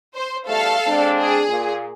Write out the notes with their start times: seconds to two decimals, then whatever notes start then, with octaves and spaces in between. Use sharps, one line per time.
0.15 C5
0.47 E2 G3 A3 A4 F5
0.86 G#3 C4 D4
1.19 G#4
1.48 A#2